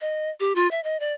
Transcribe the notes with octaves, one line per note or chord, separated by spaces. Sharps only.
D#5
G4
F4
E5
D#5
D5